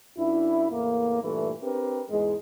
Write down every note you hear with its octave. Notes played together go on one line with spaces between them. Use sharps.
F#2 D4 E4
E2 A2 A#3
G2 A#2 E3 A3
C4 D4 G4 A#4 B4
E2 G#2 G#3